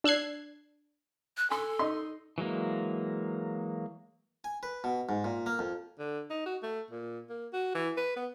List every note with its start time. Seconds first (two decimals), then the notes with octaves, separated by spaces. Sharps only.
0.04 D4 E6 F#6 G#6 C7
1.37 F#6
1.50 A4 G#5 C6
1.79 D#4 D#5 C6
2.38 E3 F#3 G#3 A#3
4.44 G#5
4.63 B4
4.84 B2
5.09 G#2
5.24 A#2
5.46 A#3
5.59 F2
5.99 D3
6.30 D#4
6.46 F#4
6.63 A3
6.90 A#2
7.29 A#3
7.53 F#4
7.75 E3
7.97 B4
8.16 B3